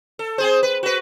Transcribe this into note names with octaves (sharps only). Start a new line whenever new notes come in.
A4
C4 G#4 C5
B4
F#4 B4